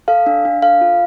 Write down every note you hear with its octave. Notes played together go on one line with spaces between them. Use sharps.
A4 F5
D4
D4
A4 F5
F4